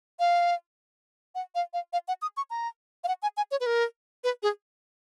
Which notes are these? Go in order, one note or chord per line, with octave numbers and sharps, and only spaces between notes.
F5
F#5
F5
F5
F5
F#5
D#6
C#6
A#5
F5
F#5
G#5
G#5
C#5
B4
A#4
B4
G#4